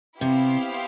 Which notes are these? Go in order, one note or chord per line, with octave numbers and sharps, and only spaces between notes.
C3 B3 E4 G4 C5 F5